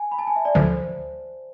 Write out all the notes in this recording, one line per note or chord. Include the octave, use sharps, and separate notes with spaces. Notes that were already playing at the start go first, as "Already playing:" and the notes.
Already playing: G#5
B5
A5
G#5
E5
D5
D2 D3 F3 C5